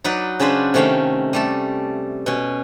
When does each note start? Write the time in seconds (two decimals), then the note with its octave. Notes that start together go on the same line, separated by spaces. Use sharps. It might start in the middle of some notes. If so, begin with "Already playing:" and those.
0.04 F#3 D#4 F#4 B4 D5
0.40 C#3 C#4 D4 B4 C5
0.74 C3 D#3 A3 C#4 F5 G5
1.33 G3 A3 A4
2.26 B2 C#4